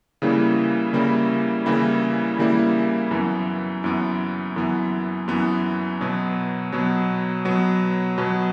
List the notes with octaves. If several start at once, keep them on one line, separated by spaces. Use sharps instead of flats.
C#3 E3 G3 A#3 E4
C#3 E3 G3 A#3 E4
C#3 E3 G3 A#3 E4
C#3 E3 G3 A#3 E4
F#2 E3 B3
F#2 E3 B3
F#2 E3 B3
F#2 E3 B3
B2 F#3 B3
B2 F#3 B3
B2 F#3 B3
B2 F#3 B3